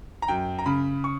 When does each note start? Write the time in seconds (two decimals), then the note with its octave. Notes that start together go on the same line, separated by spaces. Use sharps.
0.22 A#5
0.28 F#2 G5
0.59 A#5
0.66 C#3 B5
1.04 C#6